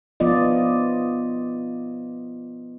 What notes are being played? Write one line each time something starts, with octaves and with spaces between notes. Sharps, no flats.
F3 B3 F4 D5 D#5